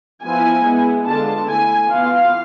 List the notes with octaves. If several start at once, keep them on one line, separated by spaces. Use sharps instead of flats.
F3 B3 E4 G#5
G#3 B3 E4
D3 G#3 B3 D4 F4 A5
A3 E4 G#5
E3 B3 F4 F5